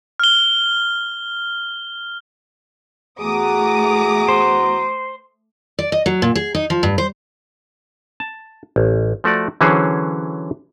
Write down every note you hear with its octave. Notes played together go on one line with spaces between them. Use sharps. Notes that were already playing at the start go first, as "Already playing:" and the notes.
F6 G7
E2 A3 F#4 G#4 A#5 D6 D#6
C5
D5
D#5
F#3
A#2
G#4
D#4
F3
G2
C5
A5
A1
F3 A3 F#4 D5
D3 E3 F#3 C#4 G#4 C5